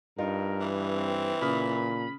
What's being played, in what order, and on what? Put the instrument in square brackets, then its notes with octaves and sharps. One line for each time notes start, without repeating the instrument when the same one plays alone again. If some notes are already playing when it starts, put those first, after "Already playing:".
[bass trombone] G2 [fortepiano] D#4 F4 [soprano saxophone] A#4
[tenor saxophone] E3
[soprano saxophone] C4
[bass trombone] A#2 [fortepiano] C#3 D#6 F6 [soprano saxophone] B5